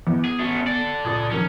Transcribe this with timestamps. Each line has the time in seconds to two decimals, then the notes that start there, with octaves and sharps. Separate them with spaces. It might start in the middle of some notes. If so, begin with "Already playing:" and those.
0.07 E2 B3 E4
0.25 G#4 G#6
0.39 A3 C#4 F#4
0.67 A4 D5
1.05 C#2 A#2 D#6 G#6
1.31 F2 D#3 F#3 C#4